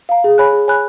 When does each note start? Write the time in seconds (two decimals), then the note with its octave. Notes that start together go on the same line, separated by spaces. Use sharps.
0.09 F5 A#5
0.24 G#4
0.38 C#5 G#5 B5 F#6
0.53 G#4
0.68 C#5 G#5 B5 F#6